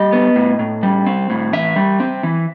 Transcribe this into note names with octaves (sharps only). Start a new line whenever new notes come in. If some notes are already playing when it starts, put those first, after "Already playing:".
Already playing: G3 D#5
B3
A2
A2
G3
C4
A2
E3 E5
G3
C4
E3